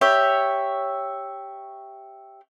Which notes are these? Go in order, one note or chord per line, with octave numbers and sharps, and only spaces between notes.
G4 C#5 E5